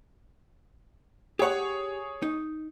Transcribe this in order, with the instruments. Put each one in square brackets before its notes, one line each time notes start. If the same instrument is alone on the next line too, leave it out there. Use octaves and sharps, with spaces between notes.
[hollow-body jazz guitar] G4 F#5 [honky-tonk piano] G#4 C#5
[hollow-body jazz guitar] D#4